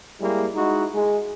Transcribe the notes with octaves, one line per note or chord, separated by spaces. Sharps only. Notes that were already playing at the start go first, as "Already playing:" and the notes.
G3 G#3 A#3 E4
G#3 D#4 E4 F#4
G#3